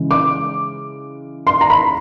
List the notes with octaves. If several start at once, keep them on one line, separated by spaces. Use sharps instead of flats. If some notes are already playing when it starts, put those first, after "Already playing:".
Already playing: C#3 E3 G#3
D6
C6
A#5
B5